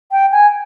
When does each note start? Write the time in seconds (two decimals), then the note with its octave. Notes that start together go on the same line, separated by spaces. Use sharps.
0.11 G5
0.32 G#5